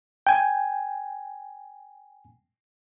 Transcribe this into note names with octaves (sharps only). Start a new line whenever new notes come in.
G5 G#5